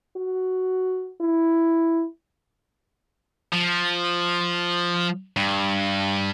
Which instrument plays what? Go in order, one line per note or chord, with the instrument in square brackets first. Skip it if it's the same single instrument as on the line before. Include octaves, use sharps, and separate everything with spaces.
[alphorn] F#4
E4
[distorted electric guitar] F3
G2